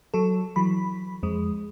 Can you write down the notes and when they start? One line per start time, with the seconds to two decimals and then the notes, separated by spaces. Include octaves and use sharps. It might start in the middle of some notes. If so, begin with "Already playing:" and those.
0.14 F#3 A4
0.56 E3 F#3 B5
1.23 F2 G#3